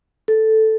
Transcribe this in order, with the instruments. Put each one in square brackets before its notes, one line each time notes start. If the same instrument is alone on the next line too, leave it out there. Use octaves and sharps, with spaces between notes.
[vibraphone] A4